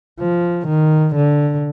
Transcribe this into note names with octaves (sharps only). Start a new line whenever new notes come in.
F3
D#3
D3